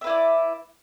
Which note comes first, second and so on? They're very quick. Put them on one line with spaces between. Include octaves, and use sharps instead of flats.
E5 B4 E4 D5